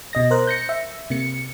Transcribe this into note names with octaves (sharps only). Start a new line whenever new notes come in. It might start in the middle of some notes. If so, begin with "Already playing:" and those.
B2 D#5 A#6
A#4 C5 F#6
G6 A#6 C#7
E5
C3 A#3 C#7